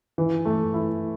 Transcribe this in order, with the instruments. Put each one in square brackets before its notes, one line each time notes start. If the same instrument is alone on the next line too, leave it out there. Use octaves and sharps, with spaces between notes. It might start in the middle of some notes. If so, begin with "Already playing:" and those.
[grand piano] E3
A3
E4